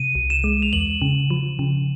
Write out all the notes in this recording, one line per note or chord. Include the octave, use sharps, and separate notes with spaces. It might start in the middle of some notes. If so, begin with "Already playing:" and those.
Already playing: C3 D#7
C2
E7
G#3
F7
E2 F#7
C#3
F3
C#3